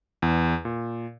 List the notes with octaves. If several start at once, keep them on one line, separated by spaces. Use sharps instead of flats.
E2
A#2